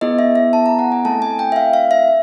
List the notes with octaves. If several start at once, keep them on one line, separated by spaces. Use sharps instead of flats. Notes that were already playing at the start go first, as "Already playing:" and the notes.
B3 E4 G#4 D#5
E5
E5
A5
A#5
F#5
G#5
A3 C4 E4 A4 A5
G#5
G5
E5
F5
F5
E5